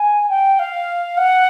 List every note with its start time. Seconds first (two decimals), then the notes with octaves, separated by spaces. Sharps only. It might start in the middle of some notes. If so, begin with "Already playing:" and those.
Already playing: G#5
0.29 G5
0.59 F5
1.17 F#5